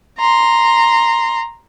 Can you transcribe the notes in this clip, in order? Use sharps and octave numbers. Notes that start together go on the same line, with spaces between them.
A#5 C6